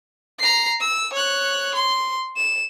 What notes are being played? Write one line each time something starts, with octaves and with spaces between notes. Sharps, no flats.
A#5 C7
E6
C#5 F#6
C6
E7